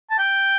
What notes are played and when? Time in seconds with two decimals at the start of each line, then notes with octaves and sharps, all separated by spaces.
0.11 A5
0.19 G5